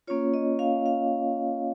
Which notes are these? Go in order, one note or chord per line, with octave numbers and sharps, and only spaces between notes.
A#3 C#4 F4 C#5
D#5
F5
F5